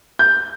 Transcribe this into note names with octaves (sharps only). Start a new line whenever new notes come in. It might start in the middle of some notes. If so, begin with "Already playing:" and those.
G6